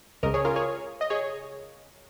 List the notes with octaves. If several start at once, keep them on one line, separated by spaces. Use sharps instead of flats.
C#2 C#3 A#4 D#5
G#4 C#5
F4 A#4
G#4 C#5
D#5
G#4 C#5